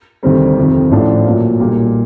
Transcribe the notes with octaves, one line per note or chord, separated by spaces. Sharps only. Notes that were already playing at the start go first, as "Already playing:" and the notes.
D2 C3 D#3 G3 C4
F2 C3 D#3
A1 A2 F3 A3 D4
A#2 F#3 A#3
B1 A#2 G3 A#3